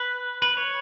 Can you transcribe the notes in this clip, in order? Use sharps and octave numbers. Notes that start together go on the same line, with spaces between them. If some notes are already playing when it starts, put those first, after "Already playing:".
Already playing: B4
B4
C#5